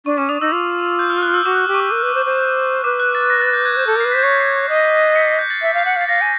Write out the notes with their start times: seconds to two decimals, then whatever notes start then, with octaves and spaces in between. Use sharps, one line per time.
0.06 D4 C#6
0.18 C#4 D6
0.29 D4 D#6
0.41 D#4 E6
0.52 F4
0.99 G6
1.10 F6
1.22 F6 F#6
1.34 E6
1.45 F#4 D6
1.68 G4
1.74 C#6
1.80 D6
1.91 A#4
2.03 B4
2.15 C5
2.26 C5
2.84 B4 D6
3.00 F#6
3.15 A6
3.30 A#6
3.41 A6
3.53 G6
3.65 G#6
3.77 C5 G6
3.87 A4 G6
3.96 A#4
4.00 B4 C7
4.12 C5 B6
4.23 C#5 C7
4.32 B6
4.40 C7
4.69 D#5
5.16 B6 C#7
5.27 C7
5.39 G6
5.50 A6
5.62 E5
5.74 F5
5.85 F#5
5.96 F5
6.01 A6
6.08 F5 A#6
6.21 G#5